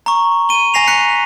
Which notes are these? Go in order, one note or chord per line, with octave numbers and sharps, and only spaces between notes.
A#5 C#6
D#7 G7
G#5 A#6 C7 F7
A#5 F#6 B6 C#7